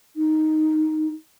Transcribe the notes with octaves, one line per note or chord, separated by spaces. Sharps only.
D#4